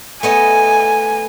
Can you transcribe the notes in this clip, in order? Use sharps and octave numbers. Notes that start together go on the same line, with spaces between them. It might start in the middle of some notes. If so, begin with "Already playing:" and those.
A3 B3 D#5 G#5